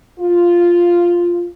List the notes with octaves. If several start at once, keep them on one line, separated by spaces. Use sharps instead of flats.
F4